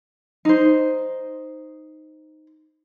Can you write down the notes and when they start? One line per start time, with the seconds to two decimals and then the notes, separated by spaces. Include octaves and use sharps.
0.45 D#4 C5